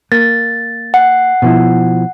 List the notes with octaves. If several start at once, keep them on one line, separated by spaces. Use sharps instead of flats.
A#3 A6
F#5
B2 F3 E4